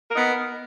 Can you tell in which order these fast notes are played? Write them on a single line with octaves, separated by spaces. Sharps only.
A#4 D#4 B3